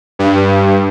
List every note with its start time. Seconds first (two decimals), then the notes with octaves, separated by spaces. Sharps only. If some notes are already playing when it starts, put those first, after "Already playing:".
0.19 G2